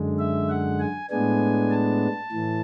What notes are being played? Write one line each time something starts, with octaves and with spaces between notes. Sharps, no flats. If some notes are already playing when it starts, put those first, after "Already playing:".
Already playing: F#2 D3 G#3
E5
F#5
G#5
A2 G#3 B3 D4 G#5
A5
A2 E3